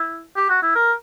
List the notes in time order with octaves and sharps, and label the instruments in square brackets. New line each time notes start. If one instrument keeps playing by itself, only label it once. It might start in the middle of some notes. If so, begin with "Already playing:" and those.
Already playing: [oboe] E4
G4
F#4
E4
A#4